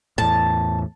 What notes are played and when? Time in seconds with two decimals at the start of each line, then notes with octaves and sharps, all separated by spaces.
0.18 E2 A2 A5